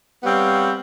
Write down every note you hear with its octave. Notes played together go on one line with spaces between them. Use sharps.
G3 B3 C4 C#5 F5